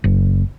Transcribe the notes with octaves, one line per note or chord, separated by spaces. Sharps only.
F#1